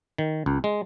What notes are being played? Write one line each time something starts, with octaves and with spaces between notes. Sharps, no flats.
D#3
C#2
G#3